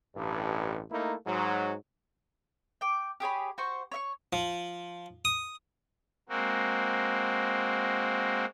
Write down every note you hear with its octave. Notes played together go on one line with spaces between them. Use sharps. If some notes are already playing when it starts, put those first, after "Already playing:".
A1 G2
A3 A#3 D#4 E4
G#2 F#3
G5 D6
G4 G#4 C#5 B5
F#4 C5 C#6
C#5 E5 C#6
F3
D#6
G#3 A#3 C4 F#4